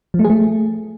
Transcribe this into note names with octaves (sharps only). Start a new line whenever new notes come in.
F3
A3
G#4
A3